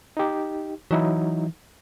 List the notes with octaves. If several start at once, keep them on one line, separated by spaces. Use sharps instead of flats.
D#4 G4
E3 F#3 D#4 E4